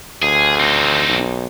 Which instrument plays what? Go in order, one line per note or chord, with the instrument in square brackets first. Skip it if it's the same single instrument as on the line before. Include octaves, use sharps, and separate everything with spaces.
[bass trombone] D2 [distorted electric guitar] G#4
[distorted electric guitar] C4 D#4
[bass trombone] B1